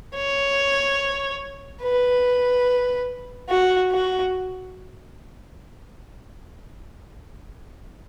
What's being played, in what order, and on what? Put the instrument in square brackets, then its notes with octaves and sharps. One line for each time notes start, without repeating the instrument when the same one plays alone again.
[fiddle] C#5
B4
F#4
F#4